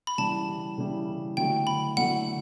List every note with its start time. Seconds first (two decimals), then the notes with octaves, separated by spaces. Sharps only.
0.07 B5
0.18 C#3 E3 G3 A5
0.78 C#3 E3 G3
1.37 D3 F#3 A3 E4 G5
1.67 B5
1.97 D3 F#3 A3 E4 F#5